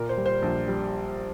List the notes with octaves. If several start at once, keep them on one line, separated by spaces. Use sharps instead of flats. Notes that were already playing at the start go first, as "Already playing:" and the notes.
Already playing: A#2 A#4
C5
G3
C5
A#1
G3